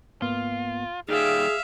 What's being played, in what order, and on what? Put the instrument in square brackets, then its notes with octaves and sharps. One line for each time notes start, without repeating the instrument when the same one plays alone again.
[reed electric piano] G#2 A#3 B3 [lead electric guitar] F4
[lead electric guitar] A#2 G3 [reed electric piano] D#4 [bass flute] G#4 [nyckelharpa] E5 F5